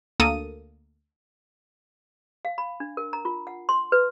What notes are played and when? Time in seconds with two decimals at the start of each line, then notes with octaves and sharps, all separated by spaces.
0.20 D2 A#3 A4 D#6 D#7
2.45 F5
2.58 B5
2.80 D4
2.97 A#4
3.13 A#5
3.25 F4
3.47 F#5
3.69 C6
3.92 B4